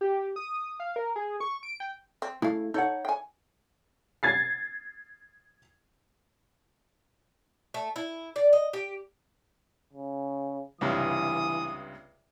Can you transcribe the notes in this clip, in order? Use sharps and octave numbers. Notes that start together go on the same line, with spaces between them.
G4
D#6
F5
A#4
G#4
C#6
D7
G5
C4
C#3 A3 E4 F5
D#4 A4 C#5 F#5
G5 G#5
G#6 A6 C7
A3
E4
D5
D#5
G4
C#3
C#2 G2 C3 E3 D#6